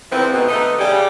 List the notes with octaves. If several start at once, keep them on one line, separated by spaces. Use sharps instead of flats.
G#2 D3 E3 F3 C4
G#2 B2
D3 A3 B3 D#4
C#3 G3